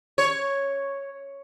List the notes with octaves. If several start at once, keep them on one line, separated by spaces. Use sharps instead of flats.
C#5